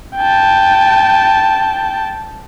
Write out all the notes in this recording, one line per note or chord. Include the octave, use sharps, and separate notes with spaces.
G5 A5